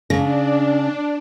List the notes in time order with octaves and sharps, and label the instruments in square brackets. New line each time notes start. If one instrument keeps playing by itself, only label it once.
[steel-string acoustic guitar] C#3 [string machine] D4